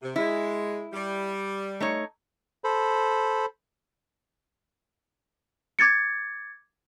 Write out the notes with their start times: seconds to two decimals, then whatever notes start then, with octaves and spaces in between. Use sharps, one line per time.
0.02 C3
0.16 G#3 E4
0.93 G3
1.80 A3 D#4 C#5
2.64 A4 C5 B5
5.79 D6 G#6 A6 C#7